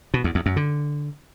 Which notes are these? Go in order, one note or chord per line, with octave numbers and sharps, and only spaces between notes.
B2
E2
E2
F#2
D3